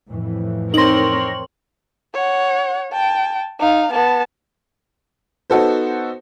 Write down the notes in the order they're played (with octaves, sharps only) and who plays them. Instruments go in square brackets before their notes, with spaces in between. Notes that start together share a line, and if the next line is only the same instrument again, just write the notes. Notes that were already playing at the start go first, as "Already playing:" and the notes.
[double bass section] F2 A2 E3
[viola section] C4 A#4 C#5 [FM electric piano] D#4 A#6 [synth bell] C6 F#7
[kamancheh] C#5 F#5
G5 A5
D#4 F5
B3 A5
[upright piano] B3 D#4 F#4 A4 C5